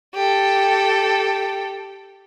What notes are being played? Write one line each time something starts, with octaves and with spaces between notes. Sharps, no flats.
G4 A4